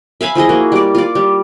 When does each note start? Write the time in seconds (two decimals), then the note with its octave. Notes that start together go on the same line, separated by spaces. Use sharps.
0.21 E5 F5 G#5 B5
0.35 F3 E4 G#4 D#5
0.49 A#3 F#4
0.72 G3 D5
0.95 F4 D5
1.15 G3